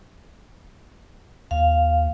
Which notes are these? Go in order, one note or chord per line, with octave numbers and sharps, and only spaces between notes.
D#2 F5